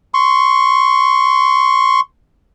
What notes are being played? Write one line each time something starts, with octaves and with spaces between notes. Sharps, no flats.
C6 C#6